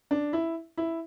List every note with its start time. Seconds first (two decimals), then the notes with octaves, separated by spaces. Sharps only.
0.11 D4
0.33 E4
0.77 E4